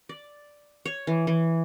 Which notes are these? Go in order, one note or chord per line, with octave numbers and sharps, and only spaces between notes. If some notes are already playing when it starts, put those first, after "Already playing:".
D5
C#5
E3
E3